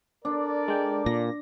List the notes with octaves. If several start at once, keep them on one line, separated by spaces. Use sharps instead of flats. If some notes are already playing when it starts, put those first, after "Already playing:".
D4 A4 A#4 D5
G#3 G5
A#2 A#6